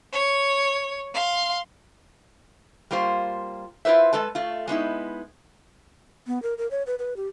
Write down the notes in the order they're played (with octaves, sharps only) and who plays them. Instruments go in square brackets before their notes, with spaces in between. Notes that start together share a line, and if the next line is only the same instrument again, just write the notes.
[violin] C#5
F5 C6
[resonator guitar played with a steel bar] G3 A#3 F4 C5
E4 F4 B4 C5 E5
G#3 A4 B4 A5
A3 F4
G#3 B3 D#4 E4
[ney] B3
A#4
A#4
C#5
B4
B4
G4